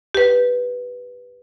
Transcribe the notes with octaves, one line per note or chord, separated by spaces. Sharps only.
G4 B4